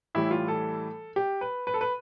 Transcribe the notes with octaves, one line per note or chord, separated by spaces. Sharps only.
A2 E3 G3 E4
F4
A4
G4
B4
B4
A4
B4